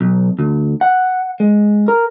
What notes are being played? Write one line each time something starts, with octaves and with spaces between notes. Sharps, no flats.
B1
D2
F#5
G#3
A#4